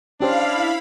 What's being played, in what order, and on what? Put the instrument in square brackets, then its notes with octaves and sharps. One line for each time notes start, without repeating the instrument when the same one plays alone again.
[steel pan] C#4 G4 C5 [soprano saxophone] D4 [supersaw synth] E4 B5 [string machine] F5